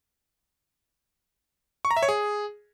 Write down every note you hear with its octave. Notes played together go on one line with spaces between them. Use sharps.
C#6
A#5
E5
C#5
G#4